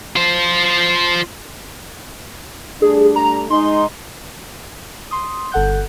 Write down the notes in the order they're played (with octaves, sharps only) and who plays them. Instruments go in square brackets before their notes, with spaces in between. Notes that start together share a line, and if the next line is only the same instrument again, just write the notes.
[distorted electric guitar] F4 C5
[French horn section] G3 A3 D4 [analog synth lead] G#4
[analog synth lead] A#5
[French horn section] G#3 D#4 [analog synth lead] C6
[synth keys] C6 D#6
G1 A4 F#5 F#6 G6